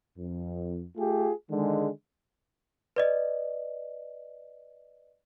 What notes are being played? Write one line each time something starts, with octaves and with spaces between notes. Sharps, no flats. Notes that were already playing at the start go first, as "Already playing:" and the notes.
F2
A3 F4 G4 G#4
D3 D#3 G#3
B4 D5 D#5